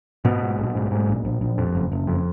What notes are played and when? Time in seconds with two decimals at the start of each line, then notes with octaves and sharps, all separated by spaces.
0.25 G#2 B2 B3
0.42 G#2
0.58 A#1
0.75 G#2
0.91 G#2
1.09 A#1
1.25 A#1
1.41 A#1
1.58 F2
1.75 F#1
1.92 F#1
2.07 F2